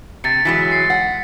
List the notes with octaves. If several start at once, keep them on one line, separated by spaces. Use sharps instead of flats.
C3 A6 C#7
E3 F#3 G#3 B6
C7
F#5